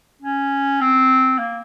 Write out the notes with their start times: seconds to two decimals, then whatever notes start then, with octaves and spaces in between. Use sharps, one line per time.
0.22 C#4
0.81 C4
1.39 A#3